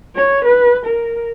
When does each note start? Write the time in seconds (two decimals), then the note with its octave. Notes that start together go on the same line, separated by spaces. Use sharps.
0.16 C#5
0.45 B4
0.86 A#4